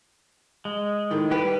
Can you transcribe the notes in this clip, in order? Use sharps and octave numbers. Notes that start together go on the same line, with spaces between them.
G#3
A2 D#3
G3 G4 B4